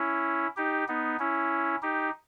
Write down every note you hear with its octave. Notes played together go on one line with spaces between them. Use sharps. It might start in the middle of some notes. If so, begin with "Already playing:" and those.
Already playing: C#4 E4
D#4 G4
B3 D#4
C#4 E4
D#4 G4